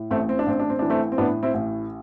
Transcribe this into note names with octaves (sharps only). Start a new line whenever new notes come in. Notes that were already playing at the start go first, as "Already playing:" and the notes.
Already playing: A2
A1 A3 C4
C4
D4
A1 C4
D4
C4
E3 D4
A3 C4
C4
A2 B3 D4
C4 E4
A1